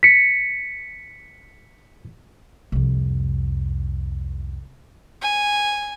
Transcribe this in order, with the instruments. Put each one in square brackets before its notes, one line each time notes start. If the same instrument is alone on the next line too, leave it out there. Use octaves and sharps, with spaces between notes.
[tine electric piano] B6 C#7
[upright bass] C2 F2
[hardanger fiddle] G#5